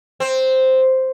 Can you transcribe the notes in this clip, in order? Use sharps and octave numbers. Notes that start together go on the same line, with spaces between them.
C4